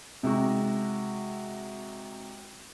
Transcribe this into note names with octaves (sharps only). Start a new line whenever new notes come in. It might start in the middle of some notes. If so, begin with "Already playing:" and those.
C3 G#3 D#4 F#4